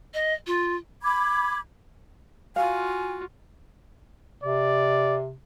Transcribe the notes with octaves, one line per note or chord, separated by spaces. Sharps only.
D#5
F4
B5 D6 G#6
F4 F#4 F5 G#5
C3 D5